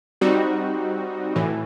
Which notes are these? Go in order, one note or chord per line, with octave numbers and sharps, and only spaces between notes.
G3 C4 D#4 F#4
A2 E3